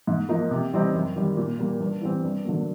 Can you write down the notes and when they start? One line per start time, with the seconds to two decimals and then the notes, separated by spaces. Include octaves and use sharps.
0.07 G#2
0.29 F3 A#3 D#4
0.51 C3
0.73 E3 G3 C4 D#4
0.94 F#2
1.16 D#3 G3
1.37 A#2
1.59 G3 A#3
1.80 G2
2.01 E3 G3 C4
2.24 G2
2.45 D3 F#3 A#3